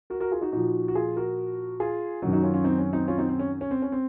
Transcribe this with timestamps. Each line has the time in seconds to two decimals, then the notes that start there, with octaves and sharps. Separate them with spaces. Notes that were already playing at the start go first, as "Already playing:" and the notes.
0.10 F#4 A#4
0.20 F#4 A#4
0.31 F4 G#4
0.41 D#4 F#4
0.52 A#2 F3 D#4 F#4
0.88 F#4
0.95 F4 G#4
1.16 F#4 A#4
1.80 F4 G#4
2.22 F#3 D#4 F#4
2.25 F#2 D#3
2.33 D#4 F#4
2.43 C#4 F4
2.54 C#4 F4
2.64 C4 D#4
2.78 C#4
2.93 C4 D#4
3.08 C#4 F4
3.18 C4 D#4
3.29 C4
3.39 C#4
3.61 C#4
3.71 C4
3.82 C#4
3.92 C4